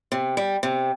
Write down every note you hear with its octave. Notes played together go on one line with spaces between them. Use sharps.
C3
G3
C3